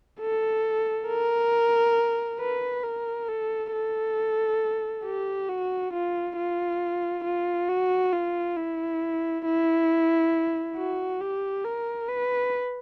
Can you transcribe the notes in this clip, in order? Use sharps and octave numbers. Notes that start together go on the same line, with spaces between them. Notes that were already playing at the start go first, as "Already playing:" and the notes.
A4
A#4
B4
A#4
A4
A4
G4
F#4
F4
F4
F4
F#4
F4
E4
E4
F#4
G4
A#4
B4